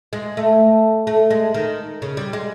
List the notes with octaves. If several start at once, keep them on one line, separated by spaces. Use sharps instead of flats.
G#3
A3
A3
G#3
D#3
C#3
G3
G#3